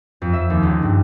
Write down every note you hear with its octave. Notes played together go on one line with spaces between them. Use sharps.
F2
E5
D#2
C#2
G2